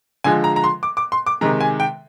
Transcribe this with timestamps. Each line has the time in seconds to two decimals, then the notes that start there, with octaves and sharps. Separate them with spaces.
0.24 D3 F3 G#3 G#5
0.44 A#5
0.56 A#5
0.64 C6
0.83 D6
0.97 D6
1.12 C6
1.26 D6
1.41 C3 D#3 G#3 A#5
1.61 G#5
1.80 G5